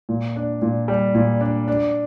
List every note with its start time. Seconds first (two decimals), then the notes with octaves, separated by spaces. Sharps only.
0.09 A#2
0.36 D4
0.62 A#2
0.88 G3
1.15 A#2
1.41 D4
1.68 D4